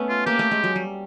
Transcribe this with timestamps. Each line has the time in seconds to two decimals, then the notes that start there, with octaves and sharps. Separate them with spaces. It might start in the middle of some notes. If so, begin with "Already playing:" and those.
Already playing: A3 B3 C#4
0.09 F4
0.26 A#3 G4
0.39 A3
0.51 G#3
0.64 F#3
0.76 G3